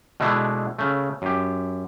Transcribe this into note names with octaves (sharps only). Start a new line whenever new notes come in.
B2 G#3 A3 D4 E4
C#3 A3
F#2 G4